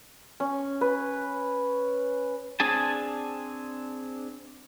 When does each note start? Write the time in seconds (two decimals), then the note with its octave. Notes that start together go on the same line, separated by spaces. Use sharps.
0.40 C#4
0.81 B4
2.60 C4 D4 G#4 G#5 A5